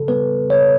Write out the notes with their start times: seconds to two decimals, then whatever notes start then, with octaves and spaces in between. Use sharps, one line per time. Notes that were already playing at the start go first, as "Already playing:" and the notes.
Already playing: C#3 A4
0.08 G3 B3 B4
0.50 C#3 C#5